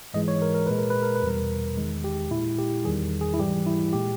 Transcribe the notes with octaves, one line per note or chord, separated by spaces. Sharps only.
G#2 E3 G#3 D#5
C#5
A#4
A#4
A#2 G#3 B4
A#4
B4
A#4
B4
E2 B2 G3 A#4
E2 D#3 G#3
G4
A#2 G#3 E4
G4
E2 D#3 G3 G#4
G#4
E4
G#2 E3 G3 G4
E4
A#2 G#3 G4